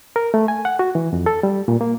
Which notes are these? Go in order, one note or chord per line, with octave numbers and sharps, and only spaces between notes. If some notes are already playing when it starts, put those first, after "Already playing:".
A#4
A3
G#5
F#5
F#4
E3
F2
A4
G3
A#2
A#3